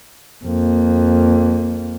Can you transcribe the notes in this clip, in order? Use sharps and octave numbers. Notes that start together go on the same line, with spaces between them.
F2 A#3